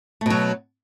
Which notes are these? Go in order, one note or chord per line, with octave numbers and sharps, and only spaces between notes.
B2 F#3 A3